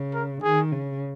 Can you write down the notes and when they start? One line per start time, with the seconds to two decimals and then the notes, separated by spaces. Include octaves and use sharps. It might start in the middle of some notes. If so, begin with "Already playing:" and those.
Already playing: C#3
0.14 A#4
0.43 D#3 G#4
0.72 C#3